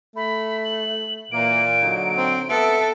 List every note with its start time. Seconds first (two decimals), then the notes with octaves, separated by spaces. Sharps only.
0.16 A3 B5
0.65 F#7
1.32 A#2 E3 A#3 D7
1.81 D3 F#3 D#4
2.18 C4
2.50 B3 A4 E5